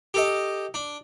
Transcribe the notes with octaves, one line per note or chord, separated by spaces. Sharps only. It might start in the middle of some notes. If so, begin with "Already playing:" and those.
G4 A4 D#5
D4